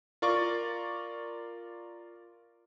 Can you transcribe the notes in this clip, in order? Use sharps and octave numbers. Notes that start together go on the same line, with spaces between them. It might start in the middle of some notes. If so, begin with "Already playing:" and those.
F4 A#4 D5 C#6